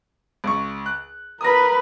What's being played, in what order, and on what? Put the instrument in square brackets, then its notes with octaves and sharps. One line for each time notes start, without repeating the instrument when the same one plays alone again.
[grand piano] C#2 C#6
F#6
[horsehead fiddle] A#4 B4 [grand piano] D#6 A#6